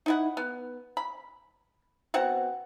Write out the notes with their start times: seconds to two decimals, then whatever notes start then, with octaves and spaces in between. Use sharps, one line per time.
0.06 D#4 E4 F#5
0.37 B3
0.97 B5
2.14 B2 C4 F#5